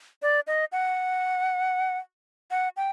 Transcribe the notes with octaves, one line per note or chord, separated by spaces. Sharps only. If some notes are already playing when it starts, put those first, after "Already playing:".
D5
D#5
F#5
F#5
G5